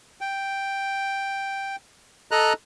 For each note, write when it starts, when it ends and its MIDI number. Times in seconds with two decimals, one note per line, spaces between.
0.21 1.76 79
2.31 2.53 69
2.31 2.53 75
2.31 2.53 82
2.31 2.53 90